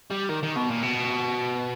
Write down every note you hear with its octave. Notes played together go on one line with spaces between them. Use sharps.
G3
D#3
D#3
B2
A#2
B2